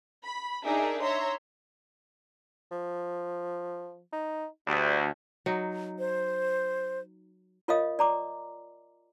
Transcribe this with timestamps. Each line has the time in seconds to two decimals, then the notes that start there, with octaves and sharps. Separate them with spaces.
0.24 B5
0.64 D4 D#4 G#4 A#4 D5 E5
1.03 C#5 E5 A#5 C6
2.71 F3
4.12 D#4
4.67 D2 G3
5.46 F#3 D#4
5.99 C5
7.68 F4 A#4 C#5 D#5 F5 D#6
7.99 D5 A#5 D6